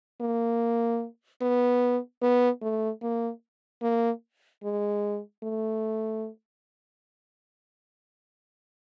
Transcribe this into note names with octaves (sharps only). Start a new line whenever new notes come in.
A#3
B3
B3
A3
A#3
A#3
G#3
A3